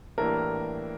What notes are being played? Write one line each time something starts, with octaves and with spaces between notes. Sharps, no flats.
A2 E3 G3 A#3 D4 A#4